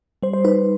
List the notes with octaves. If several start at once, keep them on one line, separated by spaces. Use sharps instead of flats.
G3 C5
C5
D#4 B4